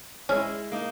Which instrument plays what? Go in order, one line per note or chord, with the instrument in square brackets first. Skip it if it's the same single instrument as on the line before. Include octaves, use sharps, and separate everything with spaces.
[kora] G#3 E4 [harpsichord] C#4
[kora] A#3 D#4